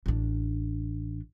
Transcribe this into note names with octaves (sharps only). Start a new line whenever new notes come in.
A1 D4